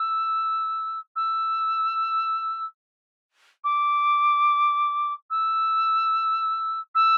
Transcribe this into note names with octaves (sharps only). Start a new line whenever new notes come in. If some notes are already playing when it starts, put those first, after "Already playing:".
Already playing: E6
E6
D6
E6
E6